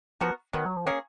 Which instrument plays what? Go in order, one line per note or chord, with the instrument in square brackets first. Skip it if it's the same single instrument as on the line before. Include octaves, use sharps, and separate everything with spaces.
[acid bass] F3 [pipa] B3 F#4 A#4
[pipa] B2 F#3 B3 [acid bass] D#3
[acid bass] F#3
F3
[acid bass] D#3 [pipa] A#3 C#4 G#4